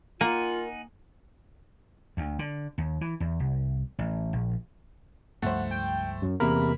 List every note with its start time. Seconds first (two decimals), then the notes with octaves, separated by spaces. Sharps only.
0.21 A#3 D#4 F4 A#4 F#5 G#5
2.17 D2
2.39 D3
2.78 D#2
3.01 E3
3.20 E2
3.40 C2
3.99 A1
4.33 A#1
5.42 C#2 G2 F3 A3 C5 F#5
5.71 G5
6.22 F#2
6.40 E2 C3 A#3 A#4 B5